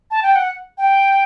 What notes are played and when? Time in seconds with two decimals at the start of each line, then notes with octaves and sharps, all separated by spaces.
0.11 A5
0.23 G5
0.35 F#5
0.78 G5